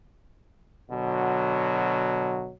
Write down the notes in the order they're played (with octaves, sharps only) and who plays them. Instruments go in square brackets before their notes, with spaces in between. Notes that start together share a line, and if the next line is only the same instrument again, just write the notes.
[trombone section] B2 D3 F#3